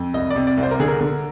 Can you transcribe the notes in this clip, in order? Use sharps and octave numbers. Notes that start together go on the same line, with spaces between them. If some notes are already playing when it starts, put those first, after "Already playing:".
Already playing: F2
C2 D#5
D5
C3
D5
C2
C5
A#4
D3 G#4
A#4
D3